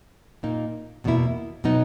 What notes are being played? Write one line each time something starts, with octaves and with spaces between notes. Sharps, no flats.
A#2 A#3 D#4
E2 B2 A#3 E4
B2 F#3 B3 D#4